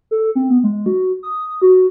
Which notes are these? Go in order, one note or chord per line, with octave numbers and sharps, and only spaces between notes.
A4
C4
B3
G#3
F#4
D#6
F#4